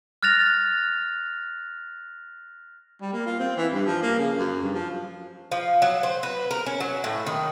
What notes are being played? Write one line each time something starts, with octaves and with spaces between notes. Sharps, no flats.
F6 F#6 A6 A#6 F7
G3
A#3
F4
C4
E3
G2
F3
A#3
C#3
F#2
G2
F3
F3
F#3
C5
B4
A#4
C#4
F#3
A2
D#3